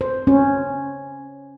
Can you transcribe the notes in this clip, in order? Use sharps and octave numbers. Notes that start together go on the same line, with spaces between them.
C5
C#4